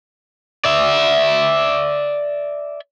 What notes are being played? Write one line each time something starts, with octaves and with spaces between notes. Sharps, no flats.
D5 E5